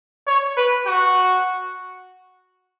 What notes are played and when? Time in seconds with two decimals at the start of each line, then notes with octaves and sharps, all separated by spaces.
0.27 C#5
0.57 B4
0.87 F#4